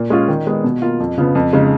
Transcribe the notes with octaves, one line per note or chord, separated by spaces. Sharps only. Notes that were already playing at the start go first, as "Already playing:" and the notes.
Already playing: A#2
G#3 C#4 F4
D#3
G#3 B3
B2
A#3 F4
F2
C#3 F3 B3
F2
C#3 G#3 D#4